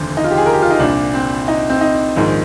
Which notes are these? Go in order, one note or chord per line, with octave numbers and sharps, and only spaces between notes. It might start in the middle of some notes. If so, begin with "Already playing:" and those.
Already playing: F1 D#2 D3 C5
D#4
F4
G4
G#4
A#4
G4
F4
D#4
C2 A#2 D4
C4
D#4
C4
D#4
A#1 G#2 D#3